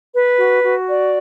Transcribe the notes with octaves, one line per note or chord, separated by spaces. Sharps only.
B4
F#4
F#4
D5